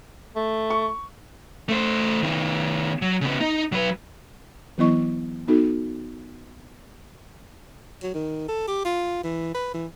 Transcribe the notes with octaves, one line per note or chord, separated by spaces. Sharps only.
A3
C#6
A3 C5
D#3 B3
F#3
C#3 B3
D#4
F#3 B4
E3 F#3 B3 E4 D#5 C#6
B3 D#4 F#4 A4
F#3
D#3
A4
G4
F4
E3
B4
E3